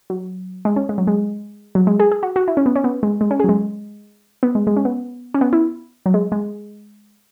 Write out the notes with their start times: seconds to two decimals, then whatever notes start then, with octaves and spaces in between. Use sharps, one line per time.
0.10 F#3
0.65 G#3
0.76 C#4
0.89 G#3
0.98 F#3
1.07 G#3
1.75 F#3
1.87 G#3
2.00 G#4
2.12 G#4
2.23 F#4
2.36 F#4
2.48 E4
2.57 C#4
2.66 B3
2.76 C#4
2.84 B3
3.03 G#3
3.21 G#3
3.31 C#4
3.40 G#4
3.44 F#3
3.49 G#3
4.43 B3
4.55 G#3
4.67 G#3
4.76 C#4
4.85 B3
5.34 C#4
5.41 B3
5.53 E4
6.06 F#3
6.14 G#3
6.32 G#3